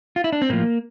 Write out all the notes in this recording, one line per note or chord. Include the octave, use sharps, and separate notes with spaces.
F4
E4
D4
C4
A2 F3 A#3